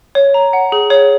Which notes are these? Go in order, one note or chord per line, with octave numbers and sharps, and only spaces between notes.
C#5
A#5
F#5
G#4
C#5